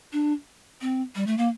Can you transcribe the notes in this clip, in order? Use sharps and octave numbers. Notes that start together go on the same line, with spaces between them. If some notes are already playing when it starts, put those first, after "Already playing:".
D4
C4
G3
A3
A#3